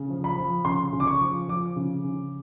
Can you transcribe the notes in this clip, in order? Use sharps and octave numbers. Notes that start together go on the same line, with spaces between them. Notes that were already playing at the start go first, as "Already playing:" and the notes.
Already playing: C#3
F3
B5
F3
C#3 C6
C#3
D6
C#6
F3
F3 D6
C#3
C#3